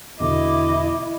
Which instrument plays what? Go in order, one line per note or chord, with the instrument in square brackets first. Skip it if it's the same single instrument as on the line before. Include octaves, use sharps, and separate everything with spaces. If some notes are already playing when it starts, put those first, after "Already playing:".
[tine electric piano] E2 B2 D3 [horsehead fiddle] E4 [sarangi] D#5 [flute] D6